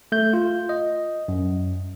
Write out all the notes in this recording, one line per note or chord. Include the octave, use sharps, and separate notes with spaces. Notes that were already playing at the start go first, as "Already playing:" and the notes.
A3 G6
F4
D#5
F#2